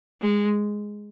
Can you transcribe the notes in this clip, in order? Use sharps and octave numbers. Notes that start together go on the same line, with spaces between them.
G#3